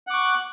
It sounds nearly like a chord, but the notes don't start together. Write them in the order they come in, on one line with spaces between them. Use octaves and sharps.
F#5 D6 C#6 F#6